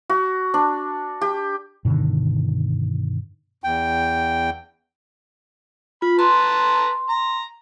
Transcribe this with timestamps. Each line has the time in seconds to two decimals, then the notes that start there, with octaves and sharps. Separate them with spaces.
0.10 F#4
0.54 D4
1.21 G4
1.85 G2 B2 D3 D#3
3.64 E2 G5
6.02 F4 B5
6.19 B4 A5 A#5 C6
7.09 A#5